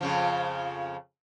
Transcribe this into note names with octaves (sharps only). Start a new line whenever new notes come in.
F2 C#3 F3